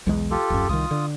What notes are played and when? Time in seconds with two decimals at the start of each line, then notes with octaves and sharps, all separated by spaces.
0.07 B1 E2 G#3
0.31 F4 G4 A4
0.50 D1 F#2
0.69 C2 D#3 F4 D#6
0.91 D3